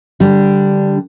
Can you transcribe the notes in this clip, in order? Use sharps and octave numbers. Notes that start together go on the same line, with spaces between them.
D3 G3 D4